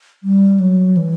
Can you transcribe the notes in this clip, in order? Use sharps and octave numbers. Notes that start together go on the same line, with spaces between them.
G3
F#3
E3